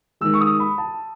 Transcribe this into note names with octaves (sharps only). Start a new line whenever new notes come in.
D#3 G#3 E6
C#6
D#6
B5
A5